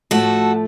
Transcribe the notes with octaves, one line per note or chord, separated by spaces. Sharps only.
A2 F3 A3 F#4 A4